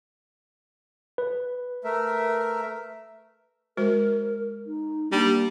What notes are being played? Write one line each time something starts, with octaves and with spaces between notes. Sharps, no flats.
B4
A3 A#4 E5
G#3 F#4 A#4 C5
D#4
G3 A#3 D4